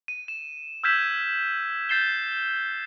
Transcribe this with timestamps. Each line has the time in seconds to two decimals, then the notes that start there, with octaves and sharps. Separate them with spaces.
0.08 D#7
0.28 E7
0.84 E6 F6 G6 G#6 B6 E7
1.89 G6 A6 C7 E7 G7